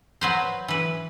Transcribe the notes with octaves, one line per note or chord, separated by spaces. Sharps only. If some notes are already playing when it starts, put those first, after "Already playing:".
F#3 B4 C5
E3 B4